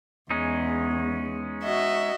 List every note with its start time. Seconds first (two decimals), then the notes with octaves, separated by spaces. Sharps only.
0.31 E2 G#3 C#4 D#4
1.64 F#4 D#5 E5